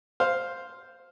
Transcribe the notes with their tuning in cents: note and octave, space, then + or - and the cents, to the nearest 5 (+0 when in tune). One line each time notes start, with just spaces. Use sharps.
C5 +0 F5 +0